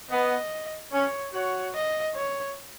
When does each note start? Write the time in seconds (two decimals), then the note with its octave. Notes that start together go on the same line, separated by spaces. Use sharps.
0.10 B3 D#5
0.93 C#4 C#5
1.33 F#4 C#5
1.74 D#5
2.15 C#5